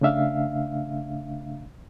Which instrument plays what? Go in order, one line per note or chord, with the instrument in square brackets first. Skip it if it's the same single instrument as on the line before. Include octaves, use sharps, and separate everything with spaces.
[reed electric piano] C#3 A3 D4 E5 F5